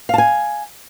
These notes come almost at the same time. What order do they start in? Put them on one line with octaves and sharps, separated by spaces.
F5 A5 G#5